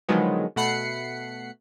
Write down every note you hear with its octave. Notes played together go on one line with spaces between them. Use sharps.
D3 D#3 F3 F#3 G#3 B3
B2 A3 F#5 B5 C7 C#7